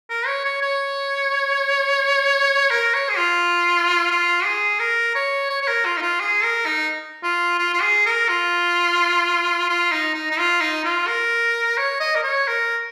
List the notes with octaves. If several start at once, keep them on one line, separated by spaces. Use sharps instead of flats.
A#4
C#5
C#5
C#5
A#4
C#5
G#4
F4
F4
G#4
A#4
C#5
C#5
C#5
A#4
F4
D#4
F4
G#4
A#4
D#4
F4
F4
F4
G#4
A#4
F4
F4
D#4
D#4
D#4
F4
D#4
F4
A#4
C#5
D#5
A#4
C#5
A#4